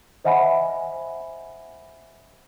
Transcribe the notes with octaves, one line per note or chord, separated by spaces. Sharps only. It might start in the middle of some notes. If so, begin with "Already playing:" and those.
C5 D#5 E5 F#5 G#5 B5